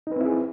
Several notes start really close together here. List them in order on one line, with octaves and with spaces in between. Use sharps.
D#4 B4 C4 E4 G#4